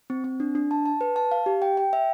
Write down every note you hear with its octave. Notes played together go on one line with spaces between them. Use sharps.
C4
C4
D4
D4
A5
A5
B4
A5
F5
G4
G5
G5
E5